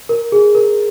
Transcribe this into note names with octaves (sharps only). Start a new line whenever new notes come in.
A#4
G#4
A#4